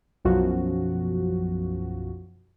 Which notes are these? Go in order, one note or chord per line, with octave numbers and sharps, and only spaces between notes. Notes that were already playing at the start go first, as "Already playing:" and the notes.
B1 F#2 F3 F#4